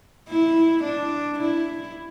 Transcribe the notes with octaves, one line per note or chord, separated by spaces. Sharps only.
E4
D4
E4